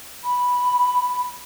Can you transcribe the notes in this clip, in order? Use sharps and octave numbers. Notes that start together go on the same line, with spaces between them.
B5